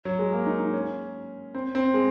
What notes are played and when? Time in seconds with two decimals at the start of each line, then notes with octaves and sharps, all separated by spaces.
0.05 F#3
0.19 G#3
0.32 A#3
0.46 D#4
0.59 D#4
0.73 C#4
1.55 C4
1.75 C4
1.94 G#3